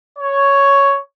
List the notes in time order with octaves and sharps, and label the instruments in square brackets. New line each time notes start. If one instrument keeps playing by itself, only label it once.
[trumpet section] C#5